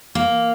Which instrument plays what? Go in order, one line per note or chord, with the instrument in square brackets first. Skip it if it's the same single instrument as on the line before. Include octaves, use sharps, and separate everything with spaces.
[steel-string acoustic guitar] A#3